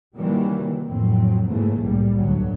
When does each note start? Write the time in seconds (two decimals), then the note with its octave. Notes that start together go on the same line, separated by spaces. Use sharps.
0.16 C3 D#3 E3 F#3 G3 A#3
0.88 F2 A2 F#3 C4
1.48 G#2 C#3 E3 A3 A#3
1.81 C2 F#2 A2 G3
2.17 D2 G2 F#3